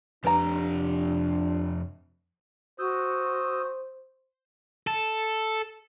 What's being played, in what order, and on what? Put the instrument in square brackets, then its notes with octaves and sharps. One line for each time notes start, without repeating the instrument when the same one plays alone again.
[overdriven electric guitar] F2 G4 [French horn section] D4 [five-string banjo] B4 A#5
[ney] F#4 [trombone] C5 [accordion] D#6 E6 G6
[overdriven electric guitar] A4